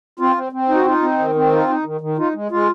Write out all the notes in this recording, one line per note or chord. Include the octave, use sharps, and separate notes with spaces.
C4 F4
C4
C4
D#4
F#4
D#4 F4
C4
D#3
C4
D#4 F4
D#4
D#3
D#3
D#4 F4
G#3
G#3 F4